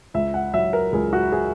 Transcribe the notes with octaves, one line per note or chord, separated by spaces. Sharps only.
C#2 E5
F#5
F#3 E5
A#4
C#2 G#4
F#4
G#4